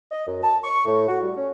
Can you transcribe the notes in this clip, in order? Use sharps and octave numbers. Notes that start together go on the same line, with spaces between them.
D#5
F#2
A5
C#6
A2
F#4
G3
C#4